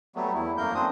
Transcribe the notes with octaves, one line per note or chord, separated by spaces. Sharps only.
F#3 G3 A3 B3
E2 E4
F#2 A3 A#3 A#4 G6
F#2 C4 D4 C5 D#6